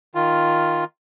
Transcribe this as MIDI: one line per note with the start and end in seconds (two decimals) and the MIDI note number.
0.15 0.84 51
0.15 0.84 65